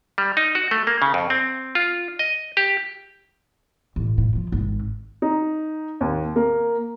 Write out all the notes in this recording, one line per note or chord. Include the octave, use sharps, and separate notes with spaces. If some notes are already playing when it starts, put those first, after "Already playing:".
G3
D#4
F#4
A3
A#3
C#3
F2
C4
F4
D#5
G4
A1
A2
F3
G#1
D#4
D#2
A#3